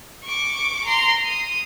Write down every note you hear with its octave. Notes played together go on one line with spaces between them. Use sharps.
C#6 D6
A#5 C6
D#6